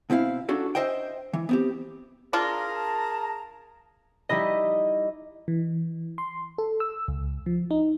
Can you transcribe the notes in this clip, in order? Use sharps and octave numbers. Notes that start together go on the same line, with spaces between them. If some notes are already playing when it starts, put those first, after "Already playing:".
B2 C4 E4 F5
C#4 D4 F#4 A4
C5 D#5 E5 G5
E3
B3 C4 G4
D4 F4 G#4 A#4 A#5
A5
G3 D#4 E4 D#5
E3
C6
A4
E6
C#2
F3
D#4